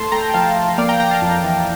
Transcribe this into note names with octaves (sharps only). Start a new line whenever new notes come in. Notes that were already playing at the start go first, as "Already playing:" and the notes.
Already playing: A3 A5 C6
A3 G5 A#5
G5
F3 F5 A5
F3
A#3 D5 F5
G5 A#5
A#3 G5 A#5
F5 A5
F2
E3